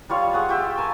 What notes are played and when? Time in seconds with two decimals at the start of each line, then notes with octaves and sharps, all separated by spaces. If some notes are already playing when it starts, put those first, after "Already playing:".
0.09 G3 F4 C#5 F5
0.33 G#4 F#5 C#6
0.49 F4 G4 E5
0.78 A#4 G#5 A5